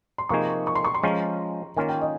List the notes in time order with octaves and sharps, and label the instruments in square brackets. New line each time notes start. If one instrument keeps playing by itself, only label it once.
[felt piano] C6
[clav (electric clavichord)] C3 F3 A#3 D#4 G#4 [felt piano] C#6
[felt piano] C#6
C6
C#6
C6
[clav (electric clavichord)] F3 G#3 C#4 F4 C5 [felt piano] A#5
[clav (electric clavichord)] D#3 A#3 C#4 F4 [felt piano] G#5
[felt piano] G5
D#5